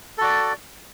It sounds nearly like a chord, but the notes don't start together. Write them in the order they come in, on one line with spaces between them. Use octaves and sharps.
A4 F#4 D5